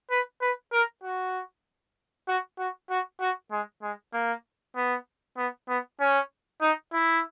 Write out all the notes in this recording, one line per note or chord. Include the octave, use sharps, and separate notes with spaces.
B4
B4
A#4
F#4
F#4
F#4
F#4
F#4
G#3
G#3
A#3
B3
B3
B3
C#4
D#4
E4